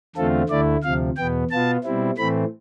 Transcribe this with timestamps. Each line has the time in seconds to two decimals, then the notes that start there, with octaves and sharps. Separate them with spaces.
0.16 E2 D3 A3 C4 F4 A4
0.49 D2 D3 A3 E4 D5
0.83 D2 C3 F3 F5
1.16 E2 B2 B3 G5
1.51 B2 B3 F4 A5
1.84 B2 G3 C4 E4
2.17 A2 E3 A3 C4 B5